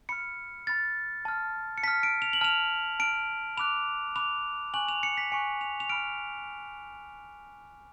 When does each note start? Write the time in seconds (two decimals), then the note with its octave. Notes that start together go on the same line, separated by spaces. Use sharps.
0.09 B5 F6 C#7
0.67 B5 F6 A6
1.25 A5 F6
1.78 C#7
1.83 A5 F6 B6
2.03 D7
2.22 F7
2.33 F#7
2.41 A5 F6 F7
2.99 A5 F6 D7
3.57 B5 D6 F#6 F7
4.16 B5 D6 F#6 F7
4.74 G#5 C#6 F#6 F#7
4.88 F7
5.03 C#7
5.17 B6
5.32 G#5 C#6 F#6 C#7
5.61 F7
5.80 F7
5.90 B5 F6 D7